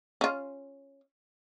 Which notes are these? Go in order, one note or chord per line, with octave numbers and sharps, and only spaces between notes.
C#4 F4